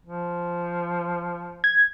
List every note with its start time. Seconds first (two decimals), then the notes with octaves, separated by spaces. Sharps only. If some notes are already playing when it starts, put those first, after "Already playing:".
0.06 F3
1.64 G#6